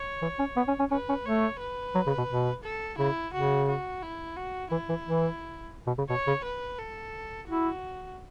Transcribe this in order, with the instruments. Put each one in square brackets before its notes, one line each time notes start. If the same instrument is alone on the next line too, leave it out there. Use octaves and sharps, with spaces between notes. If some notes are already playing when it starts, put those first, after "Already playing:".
Already playing: [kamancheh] C#5
[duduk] E3
C#4
B3
C#4
C#4
[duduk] C#4 [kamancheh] B4
[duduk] C#4
[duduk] A3 [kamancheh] C#5
[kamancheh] B4
[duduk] F#3
C#3
B2
B2
[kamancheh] A4
[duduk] C#3 [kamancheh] E4
[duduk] C#3 [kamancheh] F#4
[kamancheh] F#4
E4
F#4
[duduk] E3 [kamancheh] E4
[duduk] E3
E3
B2
C#3
[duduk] B2 [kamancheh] C#5
[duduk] C#3
[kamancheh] B4
A4
[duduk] E4 [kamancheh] F#4